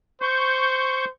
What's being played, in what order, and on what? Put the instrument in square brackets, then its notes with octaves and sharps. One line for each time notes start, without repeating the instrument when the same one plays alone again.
[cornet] C5 [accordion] C#6 G6